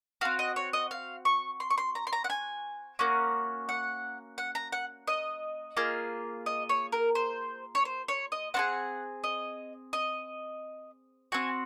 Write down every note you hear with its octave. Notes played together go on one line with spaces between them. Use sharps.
C4 F#4 F5
D#5
C#5
D#5
F5
C#6
C6
C#6
C6
A#5
C6
A#5
F#5
G#5
A#3 C#4 F#4
F#5
F#5
A#5
F#5
D#5
A#3 F4 G#4
D#5
C#5
A#4
C5
C#5
C5
C#5
D#5
C4 F4 G#4 F#5
D#5
D#5
C4 F#4 G#5